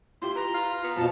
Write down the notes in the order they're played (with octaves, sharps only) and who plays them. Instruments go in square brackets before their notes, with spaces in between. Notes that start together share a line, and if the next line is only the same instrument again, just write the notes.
[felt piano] E4 F4 G4 [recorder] C6
[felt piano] B4 [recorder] A#5
[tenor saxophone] F4
B3
[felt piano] F2 [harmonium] B2 F3 [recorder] A5